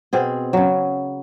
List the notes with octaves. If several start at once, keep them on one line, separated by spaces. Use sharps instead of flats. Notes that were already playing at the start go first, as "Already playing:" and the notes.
B2 C4 G#4
C#3 F#3